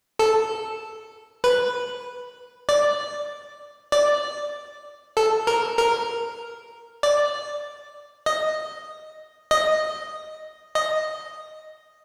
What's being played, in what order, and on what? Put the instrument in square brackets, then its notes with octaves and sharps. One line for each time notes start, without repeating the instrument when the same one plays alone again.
[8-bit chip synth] A4
B4
D5
D5
A4
A#4
A#4
D5
D#5
D#5
D#5